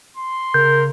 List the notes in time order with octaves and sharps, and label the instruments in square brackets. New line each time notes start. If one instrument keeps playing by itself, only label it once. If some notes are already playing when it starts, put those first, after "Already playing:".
[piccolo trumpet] C6
[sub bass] C#3 [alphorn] A#4 [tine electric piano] G6